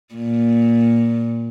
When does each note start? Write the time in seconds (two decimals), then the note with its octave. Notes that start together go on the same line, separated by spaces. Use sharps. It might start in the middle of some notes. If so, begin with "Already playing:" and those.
0.15 A#2